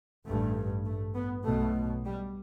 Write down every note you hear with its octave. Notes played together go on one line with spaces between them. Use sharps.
A1 G2 A3
A3
B3
B1 B2 A3
G3